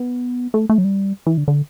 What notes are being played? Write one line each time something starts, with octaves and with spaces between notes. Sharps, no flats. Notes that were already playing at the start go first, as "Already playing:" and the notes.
Already playing: B3
A3
A3
F#3
G3
E3
D3
D3